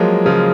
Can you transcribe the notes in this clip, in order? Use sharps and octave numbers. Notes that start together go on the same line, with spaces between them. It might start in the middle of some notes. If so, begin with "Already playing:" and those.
Already playing: F3 F#3 G#3 A#3
C#3 F3